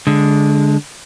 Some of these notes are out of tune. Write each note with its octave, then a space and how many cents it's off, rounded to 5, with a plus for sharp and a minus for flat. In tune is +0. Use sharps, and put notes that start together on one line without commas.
D3 -15 G#3 +0